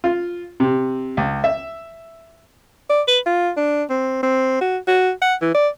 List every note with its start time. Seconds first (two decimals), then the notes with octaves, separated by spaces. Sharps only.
0.04 F4
0.60 C3
1.17 C#2
1.44 E5
2.90 D5
3.07 B4
3.26 F4
3.57 D4
3.90 C4
4.23 C4
4.61 F#4
4.88 F#4
5.22 F#5
5.41 E3
5.55 D5